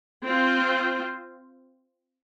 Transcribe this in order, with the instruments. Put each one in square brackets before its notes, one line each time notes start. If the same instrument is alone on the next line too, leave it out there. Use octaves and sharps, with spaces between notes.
[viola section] C4 F4 C5